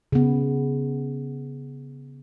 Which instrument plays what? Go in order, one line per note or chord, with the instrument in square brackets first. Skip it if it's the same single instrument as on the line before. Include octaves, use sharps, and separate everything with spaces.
[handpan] C#3 B3